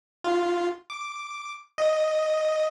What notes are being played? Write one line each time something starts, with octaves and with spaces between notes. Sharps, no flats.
F4
D6
D#5